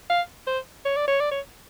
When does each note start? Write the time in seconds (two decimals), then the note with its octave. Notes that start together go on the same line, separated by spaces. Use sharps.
0.10 F5
0.47 C5
0.85 C#5
0.96 D5
1.07 C#5
1.20 D5
1.31 C#5